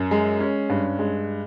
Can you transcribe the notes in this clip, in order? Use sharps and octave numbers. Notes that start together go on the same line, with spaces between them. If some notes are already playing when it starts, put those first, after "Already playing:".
Already playing: F#2
G#3
C#4
G2
G#3